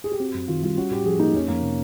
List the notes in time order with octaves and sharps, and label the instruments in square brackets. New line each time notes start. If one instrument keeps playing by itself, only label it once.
[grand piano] G#4
G4
[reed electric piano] C4 [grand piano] F#4
[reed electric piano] F#2
[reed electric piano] D#3 [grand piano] F4
[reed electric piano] G3 [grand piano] F4
[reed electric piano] C#4 [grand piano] F#4
[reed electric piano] A2 [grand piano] G4
[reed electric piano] F3 [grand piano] G#4
[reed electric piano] A#3 [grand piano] D#4
[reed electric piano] F2 [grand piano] C#4
[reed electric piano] F2 [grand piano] A#3
[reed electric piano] C3